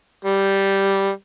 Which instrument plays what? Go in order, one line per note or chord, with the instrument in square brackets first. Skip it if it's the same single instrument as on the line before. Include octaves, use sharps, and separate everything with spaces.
[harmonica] G3